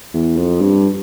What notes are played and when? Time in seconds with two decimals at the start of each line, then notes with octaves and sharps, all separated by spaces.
0.14 E2
0.37 F2
0.61 G2